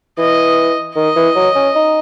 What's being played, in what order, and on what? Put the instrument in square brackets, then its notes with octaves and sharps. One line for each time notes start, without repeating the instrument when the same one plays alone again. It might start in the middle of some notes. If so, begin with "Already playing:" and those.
[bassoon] E3 [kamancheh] D#5
[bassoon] D#3 [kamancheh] D#5
[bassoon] E3
F#3
C#4
D#4